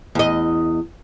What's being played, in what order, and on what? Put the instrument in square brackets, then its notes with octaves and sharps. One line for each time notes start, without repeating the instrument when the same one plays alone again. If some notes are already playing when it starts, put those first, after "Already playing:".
[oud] E2 D#5